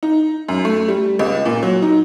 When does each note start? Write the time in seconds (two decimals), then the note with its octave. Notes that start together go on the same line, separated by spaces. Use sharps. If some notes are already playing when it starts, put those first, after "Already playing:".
0.03 D#4
0.49 F#2
0.65 A3
0.88 G3
1.19 C#2
1.45 A#2
1.63 F#3
1.82 D#4